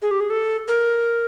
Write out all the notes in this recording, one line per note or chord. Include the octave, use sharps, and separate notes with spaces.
G#4
G4
G#4
A4
A#4